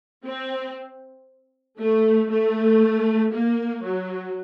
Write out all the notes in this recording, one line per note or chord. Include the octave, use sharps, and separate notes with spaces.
C4
A3
A3
A#3
F#3